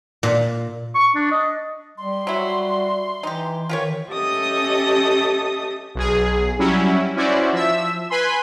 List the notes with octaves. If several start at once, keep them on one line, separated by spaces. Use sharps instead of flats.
A#2
C#6
D4
D#5
G3 C6
F#3 E4 F#4
E3 D#4 G4
D#3 E3 F4 G4 C#5
C#4 G4 A4 D#5 E5 D#6
B1 G#4
F#3 G3 C#4 E4
C#4 E4 F#4 C5 D5
F3 E5 E6
B4 G#5 B5 C6